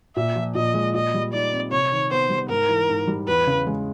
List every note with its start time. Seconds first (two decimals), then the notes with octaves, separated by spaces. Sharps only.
0.16 A#2 E5
0.36 F3
0.55 A#2 D#5
0.74 G#3
0.95 A#2 D#5
1.14 G3
1.33 D#4 D5
1.52 C4
1.72 C3 C#5
1.92 D#3
2.11 B3 C5
2.30 G3
2.49 G#2 A#4
2.69 E3
2.89 G#2
3.08 G3
3.28 E2 B4
3.47 C#3
3.67 G#3